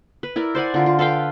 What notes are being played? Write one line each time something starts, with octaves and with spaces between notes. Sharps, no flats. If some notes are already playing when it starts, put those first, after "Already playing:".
B4
E4 A#4 D5
C5 D5 F#5 G#5
D3 F4 A#4
F4
A4 B4 F5 G5